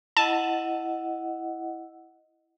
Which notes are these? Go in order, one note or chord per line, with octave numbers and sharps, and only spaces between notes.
E4 D#5 F#5 A5